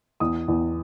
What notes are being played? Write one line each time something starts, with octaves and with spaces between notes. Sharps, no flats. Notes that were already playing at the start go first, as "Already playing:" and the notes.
E2 D#6
E2